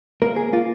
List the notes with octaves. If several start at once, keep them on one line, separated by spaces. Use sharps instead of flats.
A#3 A#4
G#4
A#3 F4